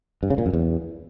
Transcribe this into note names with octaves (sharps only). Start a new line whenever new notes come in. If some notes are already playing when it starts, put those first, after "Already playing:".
G2
C#3
A#2
F#2
E2